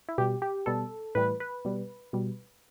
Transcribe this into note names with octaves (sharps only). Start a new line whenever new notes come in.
E4
B2 G3 G4
G4
B2 G3 A4
A2 E3 G3 B4
B4
B2 G3
B2 G3